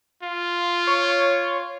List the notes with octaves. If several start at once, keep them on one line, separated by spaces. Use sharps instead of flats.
F4
C#5